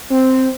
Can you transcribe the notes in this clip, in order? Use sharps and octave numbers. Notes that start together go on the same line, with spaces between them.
C4